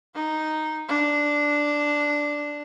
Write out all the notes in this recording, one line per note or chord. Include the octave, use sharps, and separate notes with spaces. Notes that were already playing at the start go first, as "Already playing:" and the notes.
D#4
D4